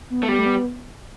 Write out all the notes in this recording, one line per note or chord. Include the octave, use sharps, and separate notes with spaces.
B3
A3
G3 B3
A3
B3